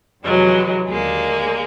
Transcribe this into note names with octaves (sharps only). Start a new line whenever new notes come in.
F2 C3 E3 F#3 G#3
D#2 D3 G#3 A#3